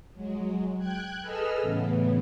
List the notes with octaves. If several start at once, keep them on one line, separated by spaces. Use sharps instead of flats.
F#3 G#3
G5 F#6 G#6
G#4 A4 B4 D#5 E6 F6
A2 C#3 E3 B3